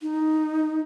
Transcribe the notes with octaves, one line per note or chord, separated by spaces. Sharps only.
D#4